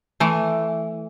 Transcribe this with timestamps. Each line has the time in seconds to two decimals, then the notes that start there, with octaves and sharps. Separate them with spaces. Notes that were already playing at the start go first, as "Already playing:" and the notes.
0.20 E3 A3